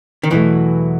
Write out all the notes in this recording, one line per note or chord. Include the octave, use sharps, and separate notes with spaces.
D#3
E2 B2 E3 F#3 A3